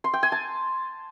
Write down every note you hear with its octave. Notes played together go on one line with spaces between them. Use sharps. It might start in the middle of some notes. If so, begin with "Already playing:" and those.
C6
G5
G#5
A5